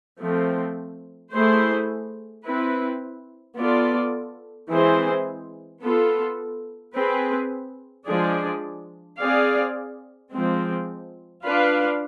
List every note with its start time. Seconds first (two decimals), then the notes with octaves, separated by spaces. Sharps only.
0.20 F3 A3 C4
1.32 A3 E4 G#4 C5
2.44 C4 E4 B4
3.57 B3 F4 A4 D5
4.69 E3 G#3 C4 G#4 C5
5.82 B3 F4 A4
6.95 C4 G#4 B4
8.08 F3 G#3 D4 G#4 D5
9.20 C4 G#4 D5 F5
10.32 F3 G#3 C4
11.45 D4 F4 B4 F5